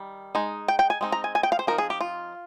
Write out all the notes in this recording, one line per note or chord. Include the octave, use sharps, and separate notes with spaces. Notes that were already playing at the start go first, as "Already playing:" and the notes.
Already playing: D#3 G3
G#3 D#4
G5
G5
G#5
G#3 C4 D#4
A#5
G#5
G#5
G5
F5
C5
F3 C4 D#4 A#4
G#4
G4
F4